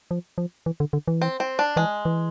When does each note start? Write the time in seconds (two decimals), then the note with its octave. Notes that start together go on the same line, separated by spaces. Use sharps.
0.11 F3
0.38 F3
0.66 E3
0.80 D3
0.93 D3
1.08 E3
1.22 C4
1.40 C4
1.59 D4
1.76 E3 G#3
2.05 E3